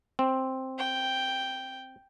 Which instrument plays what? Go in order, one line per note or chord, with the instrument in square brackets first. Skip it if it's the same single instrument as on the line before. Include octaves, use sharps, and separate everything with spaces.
[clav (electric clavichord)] C4
[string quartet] G5